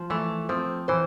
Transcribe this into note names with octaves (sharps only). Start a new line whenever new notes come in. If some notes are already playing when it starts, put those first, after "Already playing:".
Already playing: F3
E3 A3
F3 C4
E3 C5